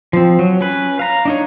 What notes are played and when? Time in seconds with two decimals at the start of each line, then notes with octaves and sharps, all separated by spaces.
0.13 F3 C4
0.39 F#3
0.61 C#4 B4
0.99 F5 A#5
1.25 D4 D#4 C#5